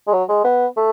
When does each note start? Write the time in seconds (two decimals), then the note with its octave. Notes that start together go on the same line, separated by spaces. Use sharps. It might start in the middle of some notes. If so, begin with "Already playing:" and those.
0.07 G#3
0.13 F#3
0.29 G#3
0.44 B3
0.77 A3